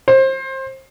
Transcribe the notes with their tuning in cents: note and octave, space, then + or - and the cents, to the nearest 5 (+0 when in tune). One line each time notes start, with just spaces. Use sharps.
C5 +25